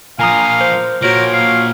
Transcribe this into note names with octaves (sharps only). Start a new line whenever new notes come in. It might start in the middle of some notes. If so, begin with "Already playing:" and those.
A#2 F3 F5 G#5 A#5 D#6
C5
A#2 F3 F#4 A#4 C#5 D7
F5